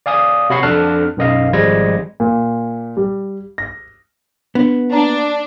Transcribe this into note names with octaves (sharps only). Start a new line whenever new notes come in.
D5 F5 G#5 D#6
C3 F#4 C#5 B5 C#6 C7
F2 D4 A4 A5 F6 F#6
B1 F#2 D#5 F5
G#1 F3 G3 G#3 G#6 A#6
A#2
G3
A#6
B3 D4
A#3 D4 A#5